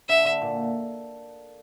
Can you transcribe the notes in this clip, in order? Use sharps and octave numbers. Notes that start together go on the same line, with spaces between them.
D3 E5
D3
A#2